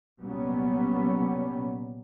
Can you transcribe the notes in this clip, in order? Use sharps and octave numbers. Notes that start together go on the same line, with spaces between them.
C2 A#2 F#3 G3 B3 C#4